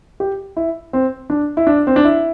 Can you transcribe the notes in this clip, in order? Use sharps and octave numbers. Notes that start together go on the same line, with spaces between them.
G4
E4
C4
D4
E4
D4
C4
D4
E4